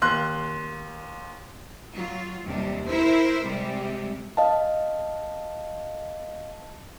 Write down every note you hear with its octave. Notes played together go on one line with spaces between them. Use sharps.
D#2 C6 F#6
F#3 F4
D#2 C3 G3 D4
E4 A#4 C5 E5
C3 G3 G#3
D#5 F5 A5